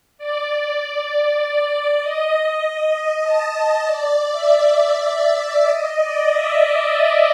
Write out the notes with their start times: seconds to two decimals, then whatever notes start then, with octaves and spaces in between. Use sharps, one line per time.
0.18 D5
2.01 D#5
2.47 D#5
2.93 D#5
3.24 A5
3.55 D#5
3.85 D5
4.31 E5
4.77 E5
5.23 E5
5.68 D#5
5.99 D5
6.30 E5
6.60 D#5